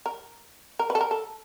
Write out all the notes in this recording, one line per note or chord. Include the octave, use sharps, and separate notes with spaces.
A#4
A#4
B4
A4
A#4
A4